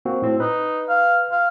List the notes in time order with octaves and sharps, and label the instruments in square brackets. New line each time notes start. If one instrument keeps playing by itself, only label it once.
[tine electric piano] A#3 C4 F#4
A2 C4
[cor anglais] D#4 [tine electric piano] B4
[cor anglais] F5
F5